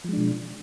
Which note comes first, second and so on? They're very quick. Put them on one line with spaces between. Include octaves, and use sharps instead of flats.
F3 G#3 D4 B2